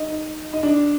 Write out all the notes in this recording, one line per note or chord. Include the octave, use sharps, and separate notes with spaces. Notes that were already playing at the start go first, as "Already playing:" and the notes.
Already playing: D#4
D#4
D4